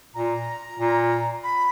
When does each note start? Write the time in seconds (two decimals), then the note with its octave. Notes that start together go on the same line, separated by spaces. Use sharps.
0.14 A#2 A#5
0.80 A#2
1.44 B5